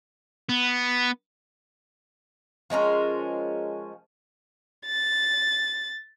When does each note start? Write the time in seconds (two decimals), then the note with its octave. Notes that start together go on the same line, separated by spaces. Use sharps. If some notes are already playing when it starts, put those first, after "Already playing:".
0.49 B3
2.70 F3 G#3 C#4 A#4
4.86 A6